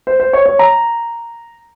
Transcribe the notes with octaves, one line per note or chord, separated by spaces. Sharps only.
C5
C5
C#5
C#5
A#5